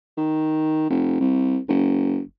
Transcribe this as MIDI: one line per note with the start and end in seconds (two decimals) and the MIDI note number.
0.17 0.86 51
0.90 1.20 29
1.21 1.58 36
1.69 2.20 30